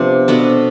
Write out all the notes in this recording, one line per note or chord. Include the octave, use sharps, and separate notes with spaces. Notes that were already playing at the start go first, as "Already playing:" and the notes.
Already playing: C3 F3 B3 D4
B2 B3 D4 A4